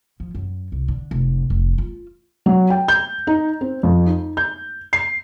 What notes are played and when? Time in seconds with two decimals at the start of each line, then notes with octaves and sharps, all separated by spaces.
0.20 F3
0.35 F#2
0.72 C2
0.88 D3
1.11 F1
1.50 F1
1.78 F4
2.46 F#3
2.70 G5
2.88 G6
3.27 D#4
3.61 C4
3.83 F2
4.06 D#4
4.37 G6
4.93 C7